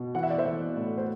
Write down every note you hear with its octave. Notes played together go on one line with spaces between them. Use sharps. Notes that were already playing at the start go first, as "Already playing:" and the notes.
Already playing: B2
E3 F#5
E5
D5
C5 E5
E3
A2
C5